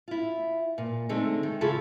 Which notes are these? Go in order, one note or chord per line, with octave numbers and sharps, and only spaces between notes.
E4 F4
A#2
D3 G#3 A3 C4 D#4
D#3
C#3 E4 F4 G#4 A4